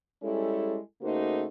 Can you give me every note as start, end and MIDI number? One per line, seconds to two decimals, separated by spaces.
0.22 0.78 55
0.22 0.78 56
0.22 0.78 61
0.22 0.78 64
0.22 0.78 69
1.02 1.46 49
1.02 1.46 57
1.02 1.46 58
1.02 1.46 63
1.02 1.46 66
1.02 1.46 72